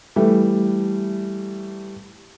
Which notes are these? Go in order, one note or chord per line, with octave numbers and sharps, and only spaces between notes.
E3 G3 A3